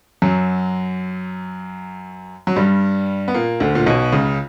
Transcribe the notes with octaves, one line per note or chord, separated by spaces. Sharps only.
F#2 F#3
F#3
G2 G3
B3
A#2 A#3
D2 D3
A#2
B1 B2
C#2 C#3